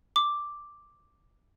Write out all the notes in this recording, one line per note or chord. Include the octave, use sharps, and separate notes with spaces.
D6